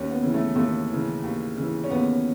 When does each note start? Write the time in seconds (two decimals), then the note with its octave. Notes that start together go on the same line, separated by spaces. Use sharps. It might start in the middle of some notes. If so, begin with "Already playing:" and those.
Already playing: D#2 C#4
0.11 B3
0.22 C#3 E3
0.34 A3
0.55 D#2 A3
0.90 C#3 E3
1.23 D#2
1.57 C#3 E3
1.84 C#4
1.90 D#2 B3